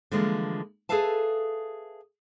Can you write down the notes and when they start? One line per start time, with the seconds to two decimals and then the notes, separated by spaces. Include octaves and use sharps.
0.11 D3 E3 F3 G3 G#3 A#3
0.89 G#4 A4 B4 E5 F5 A5